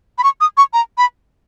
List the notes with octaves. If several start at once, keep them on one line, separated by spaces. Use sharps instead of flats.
B5
C#6
D#6
C#6
A#5
B5